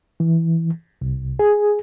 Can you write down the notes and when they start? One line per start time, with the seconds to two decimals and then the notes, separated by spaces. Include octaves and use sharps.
0.20 E3
1.01 C2
1.39 G#4